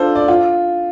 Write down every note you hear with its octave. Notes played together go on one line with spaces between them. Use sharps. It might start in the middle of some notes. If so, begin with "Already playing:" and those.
Already playing: D4 F4 A4 C5
D5
F4